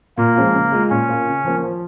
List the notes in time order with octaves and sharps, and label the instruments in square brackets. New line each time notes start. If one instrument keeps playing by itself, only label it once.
[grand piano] A#2 [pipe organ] A#3
[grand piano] F3 G#3 C#4 F4
C#3
G#3 F4
[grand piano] A#2 [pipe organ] C#4
[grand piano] A#3 F4
C#3
F3 A#3
F3